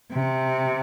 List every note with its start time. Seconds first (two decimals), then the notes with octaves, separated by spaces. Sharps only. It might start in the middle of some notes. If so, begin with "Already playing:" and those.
0.13 C3